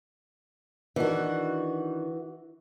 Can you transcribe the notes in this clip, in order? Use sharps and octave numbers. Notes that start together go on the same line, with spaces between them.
D#3 E3 D4 D#4 F#4